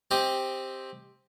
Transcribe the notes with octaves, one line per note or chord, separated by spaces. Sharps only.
C4 G4 D#5